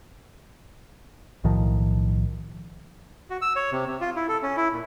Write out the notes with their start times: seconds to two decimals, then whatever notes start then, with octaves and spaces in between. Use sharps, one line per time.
1.44 B1 A2 D#3 F3
3.30 F#4
3.42 E6
3.56 C#5
3.72 C3
3.87 C3
4.01 F4
4.16 E4
4.28 A4
4.43 C#4
4.57 E4
4.73 A#2